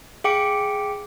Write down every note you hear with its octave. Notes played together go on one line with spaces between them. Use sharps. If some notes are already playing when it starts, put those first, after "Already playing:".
G#4 F5 G5 D6 C#7 D7